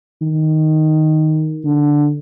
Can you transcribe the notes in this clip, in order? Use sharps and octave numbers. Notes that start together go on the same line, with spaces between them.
D#3
D3